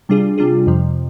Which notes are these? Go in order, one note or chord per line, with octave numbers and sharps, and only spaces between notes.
C3 G3 D4 F4 G#4
C3 G3 D4 F4 G#4
F2 C3 F3